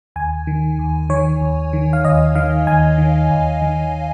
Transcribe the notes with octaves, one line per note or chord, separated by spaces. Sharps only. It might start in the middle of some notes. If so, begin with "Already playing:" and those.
D#2 G#5
D#3
D#2
D#3 C#5
D#2
D#3
F5
D#2 D#5
D#3 F5
D#2 G#5
D#3
D#2
D#3